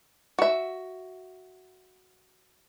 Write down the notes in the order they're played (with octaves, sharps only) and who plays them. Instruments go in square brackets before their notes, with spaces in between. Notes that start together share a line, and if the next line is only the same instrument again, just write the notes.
[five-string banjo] F#4 E5